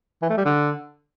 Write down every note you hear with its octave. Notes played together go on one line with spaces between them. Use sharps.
E3
A3
G3
D3